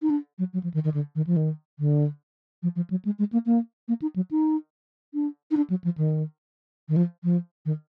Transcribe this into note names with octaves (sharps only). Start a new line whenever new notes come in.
D#4
D4
F#3
F#3
F3
D#3
D#3
D3
D#3
F3
D#3
D3
F3
F3
F#3
G#3
G#3
A#3
A#3
A#3
D#4
F#3
D#4
D4
D#4
D4
F#3
F3
D#3
D#3
F3
F3
D#3